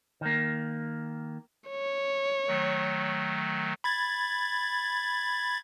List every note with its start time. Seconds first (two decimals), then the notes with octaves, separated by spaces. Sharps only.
0.21 D#3 A#3
1.70 C#5
2.47 D#3 F#3 A3
3.84 B5 G#6 A6